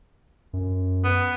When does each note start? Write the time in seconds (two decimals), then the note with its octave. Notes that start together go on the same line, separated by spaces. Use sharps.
0.53 F#2
1.04 B3